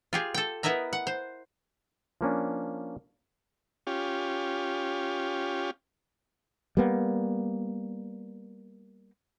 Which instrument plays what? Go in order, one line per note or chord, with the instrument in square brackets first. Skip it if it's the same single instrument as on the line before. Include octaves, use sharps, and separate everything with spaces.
[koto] F4 G4 G#4
A4 G5
B3 E4 A#4 D#5 E5 A#5
F#5
C5
[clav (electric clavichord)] F3 A#3 C#4 D4
[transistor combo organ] C#4 F4 G4
[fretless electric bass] G3 A#3 B3